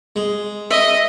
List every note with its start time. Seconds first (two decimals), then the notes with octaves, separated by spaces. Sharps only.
0.16 G#3
0.71 D#5 E5